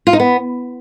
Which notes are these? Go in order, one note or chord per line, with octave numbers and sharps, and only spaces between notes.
F4
D#4
B3